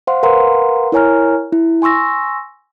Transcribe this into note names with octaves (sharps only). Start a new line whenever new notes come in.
C5 F5 F#5 C6
A#4 B4 F5 F#5 A#5 C6
E4 A#4 C#5 G#5 A#5 F6
E4
G#5 C6 C#6 E6 A#6